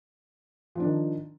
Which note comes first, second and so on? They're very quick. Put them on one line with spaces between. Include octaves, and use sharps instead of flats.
F3 D4 D#3